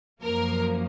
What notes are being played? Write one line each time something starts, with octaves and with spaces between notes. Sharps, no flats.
F#2 F3 A#3 A#4